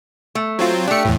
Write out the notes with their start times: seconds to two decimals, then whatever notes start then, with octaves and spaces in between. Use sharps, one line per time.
0.35 A3
0.59 F#3 C4 F4
0.88 A3 D4 G4 C#7
1.05 E2 A2